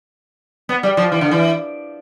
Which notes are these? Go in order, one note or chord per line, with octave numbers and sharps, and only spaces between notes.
B3
G3
F3
E3
D3
E3